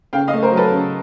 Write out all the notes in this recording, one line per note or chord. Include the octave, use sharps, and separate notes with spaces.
C#3 F5 G5
D#5 F5
A3
A#4 C5
F#3
A4 B4
C#3